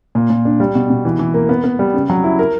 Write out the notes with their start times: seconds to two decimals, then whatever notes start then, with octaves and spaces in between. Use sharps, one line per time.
0.15 A#2
0.30 A#2
0.45 D4
0.60 G3
0.75 B2
0.90 B2
1.05 E3
1.19 E3
1.34 A#3
1.49 B3
1.64 B3
1.79 G3
1.94 C#3
2.10 F#3
2.24 E4
2.39 A#4